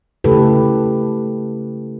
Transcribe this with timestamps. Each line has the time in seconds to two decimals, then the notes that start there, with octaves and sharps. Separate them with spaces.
0.24 C#3 A3 E4 G4 A4 B4